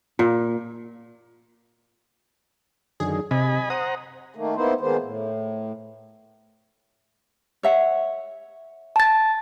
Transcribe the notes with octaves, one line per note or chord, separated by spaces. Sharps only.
A#2
F#2 D3 D#3 G#4
C3 D#5 G#5 B5
C5 F#5 A#5 D#6
D#3 A3 A#3
A#3 B3 D#4 E4 C5
D#3 G#3 A#3 B3 C5
A2
C#5 E5 F#5
A5 A6